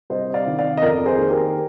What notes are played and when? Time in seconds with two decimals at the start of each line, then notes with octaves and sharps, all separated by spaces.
0.10 C2 C5 D#5
0.30 D#5
0.34 D5 F5
0.46 C3 D#3
0.59 D5 F5
0.77 D#5
0.82 F2 A#4 D5
1.06 G#4 C5
1.18 D#3 A#3 D#4
1.30 G4 A#4